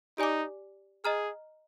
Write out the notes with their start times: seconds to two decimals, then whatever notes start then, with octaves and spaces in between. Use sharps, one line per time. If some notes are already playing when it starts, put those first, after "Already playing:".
0.18 D#4 G4 D5 G#5 D6
1.04 G#4 D#5 A#5 F6